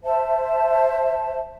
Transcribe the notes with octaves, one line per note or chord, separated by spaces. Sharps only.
C5 E5 A5